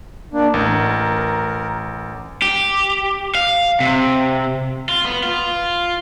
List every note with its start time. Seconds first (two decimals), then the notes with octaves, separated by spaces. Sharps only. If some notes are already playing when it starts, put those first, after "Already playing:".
0.33 A#3 D4
0.54 A1 A#4
2.42 G4
3.35 F5
3.80 C3
4.89 F4
5.05 B3
5.24 F4